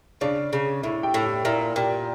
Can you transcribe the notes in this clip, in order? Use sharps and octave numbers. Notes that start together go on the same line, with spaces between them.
C#3 D4 D5
C#3
A2 E4 E5
G4 G5
A2
G4 G5
A#2 E4 E5
A#2 G4 G5